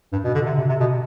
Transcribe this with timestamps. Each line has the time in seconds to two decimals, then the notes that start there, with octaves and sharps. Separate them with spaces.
0.12 G2
0.24 B2
0.34 D3
0.46 C3
0.58 C3
0.69 C3
0.80 B2